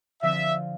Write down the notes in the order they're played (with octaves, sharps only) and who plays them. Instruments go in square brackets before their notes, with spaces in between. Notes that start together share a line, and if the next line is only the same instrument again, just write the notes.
[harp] D3 F3 C4 F4 [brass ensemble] E5